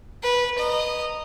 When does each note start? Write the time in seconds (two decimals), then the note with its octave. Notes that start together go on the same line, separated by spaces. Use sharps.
0.23 B4
0.58 D#5 A#5